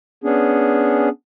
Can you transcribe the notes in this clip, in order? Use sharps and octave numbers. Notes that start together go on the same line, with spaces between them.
B3 C#4 D4 G#4